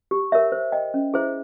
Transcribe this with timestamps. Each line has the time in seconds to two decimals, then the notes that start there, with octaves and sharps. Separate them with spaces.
0.11 G4
0.32 A#4 C#5 E5
0.52 C5
0.72 D#5 G5
0.94 C#4
1.13 E4 G#4 C5 E5